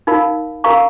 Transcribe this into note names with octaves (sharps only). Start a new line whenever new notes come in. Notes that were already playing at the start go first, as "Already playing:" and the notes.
D#4 A#4 F5 B5
A#4 F5 A#5 C#6